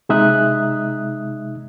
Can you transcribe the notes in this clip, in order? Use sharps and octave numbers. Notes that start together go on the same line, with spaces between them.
C3 G#3 D#4 E5 D#6 F#6